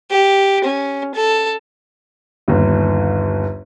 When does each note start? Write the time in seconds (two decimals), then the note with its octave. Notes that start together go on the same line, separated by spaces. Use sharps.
0.11 G4
0.64 C#4
1.15 A4
2.48 G1 D#2